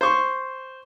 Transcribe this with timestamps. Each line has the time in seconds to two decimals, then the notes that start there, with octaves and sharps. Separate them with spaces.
0.01 C5 C#6